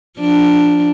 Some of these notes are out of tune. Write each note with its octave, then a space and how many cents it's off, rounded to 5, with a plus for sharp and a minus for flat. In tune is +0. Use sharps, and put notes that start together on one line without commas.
F3 +0 D4 +0